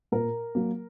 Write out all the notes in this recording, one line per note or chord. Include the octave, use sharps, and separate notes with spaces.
A#2 A#4
F#3 A#3